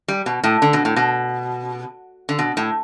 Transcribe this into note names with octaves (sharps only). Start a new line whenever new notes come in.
G3
B2
A2
D3
B2
A2
B2
D3
B2
A2